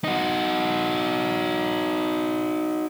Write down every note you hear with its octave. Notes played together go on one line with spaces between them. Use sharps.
D#4 F#4